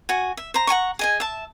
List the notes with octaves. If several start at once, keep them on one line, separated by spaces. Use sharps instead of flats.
F#4 G#5
E5
C5 A#5
F#5 G#5 A#5 C#6
G#4 D#5 G#5
E5 A5